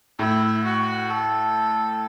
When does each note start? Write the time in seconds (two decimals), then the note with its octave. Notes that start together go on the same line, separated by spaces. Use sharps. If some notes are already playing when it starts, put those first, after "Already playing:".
0.18 A2 E4
0.64 F#4
1.10 A4